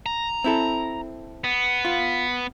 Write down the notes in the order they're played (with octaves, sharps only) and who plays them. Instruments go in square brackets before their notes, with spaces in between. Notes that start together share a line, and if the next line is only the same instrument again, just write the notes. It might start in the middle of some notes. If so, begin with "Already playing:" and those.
[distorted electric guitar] A#5
[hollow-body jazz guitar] C4 E4 A4
[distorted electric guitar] B3
[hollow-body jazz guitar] F4